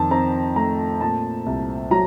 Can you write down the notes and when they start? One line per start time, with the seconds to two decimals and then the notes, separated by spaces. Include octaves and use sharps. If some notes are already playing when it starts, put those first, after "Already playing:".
Already playing: F2 D#3 A5
0.11 C4 A#5
0.56 A3 A#5
1.01 A#2 A5
1.46 C2
1.91 F#3 A#5